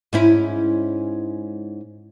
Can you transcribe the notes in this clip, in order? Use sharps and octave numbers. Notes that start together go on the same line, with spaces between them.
G#2 C#4 E4